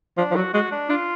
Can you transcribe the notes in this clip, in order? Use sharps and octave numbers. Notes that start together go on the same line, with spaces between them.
F3 D4
F3
F#3 F#4
G#3 F#4
D4
D4 F4